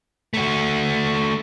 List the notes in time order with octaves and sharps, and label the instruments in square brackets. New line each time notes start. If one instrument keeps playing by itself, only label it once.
[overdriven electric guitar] A3 F#4